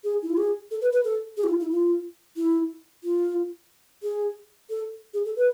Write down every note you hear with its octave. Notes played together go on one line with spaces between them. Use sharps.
G#4
E4
F4
G#4
A4
B4
B4
A4
G#4
E4
F4
E4
F4
E4
F4
G#4
A4
G#4
A4
B4